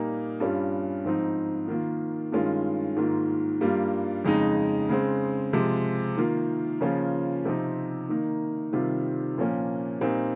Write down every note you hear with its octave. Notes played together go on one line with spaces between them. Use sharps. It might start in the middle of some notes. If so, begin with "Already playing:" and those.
Already playing: A#2 G3 A#3 D#4
G2 G3 C#4 F4
G#2 F3 C4 D#4
D#3 A#3 F4
G2 D#3 G#3 C#4 F4
G#2 D#3 A#3 F4
G2 G3 A#3 F4
F2 C#3 G#3 D#4
C#3 G#3 C4
C3 F3 G#3
D#3 A#3 F4
C#3 F3 A#3 C#4 F4
C3 F3 C4 D#4
D#3 A#3 D#4
C3 D#3 G3 C4 F4
A#2 F3 A#3 C#4
A#2 G3 C4 D#4